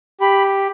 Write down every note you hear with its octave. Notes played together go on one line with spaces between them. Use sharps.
G4 B5